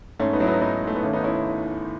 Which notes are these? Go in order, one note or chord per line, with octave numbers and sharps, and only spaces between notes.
G#2 A3 C#4
B3 D#4
F#3 E4
B3 D#4
E4
G#2 B3 D#4
G#2 A3
B3
D#2 A3 C#4
B3 D#4
C#4 E4